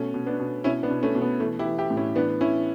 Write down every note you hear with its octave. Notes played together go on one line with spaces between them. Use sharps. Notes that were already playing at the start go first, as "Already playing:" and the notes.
Already playing: B2 A3 C#4
B2
B3 D4
B2
B2 C#4 E4
B3 D4
B2
A3 C#4
B2
B3
E3 A3
E4 G4
E3
E4 G4
A2
C#4 E4
E3 B3 D4
E3 C#4 E4